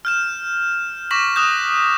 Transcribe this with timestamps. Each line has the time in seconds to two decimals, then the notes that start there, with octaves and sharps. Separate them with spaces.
0.05 F6 G6 E7
1.11 C#6 D6 A#6 B6 E7 F#7
1.36 D#6 F#6 G6 E7